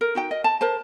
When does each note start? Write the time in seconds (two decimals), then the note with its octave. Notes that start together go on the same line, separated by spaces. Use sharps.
0.01 A#4
0.15 D#4 F#4 G5
0.31 D#5
0.44 A5
0.61 A#4 C5 A5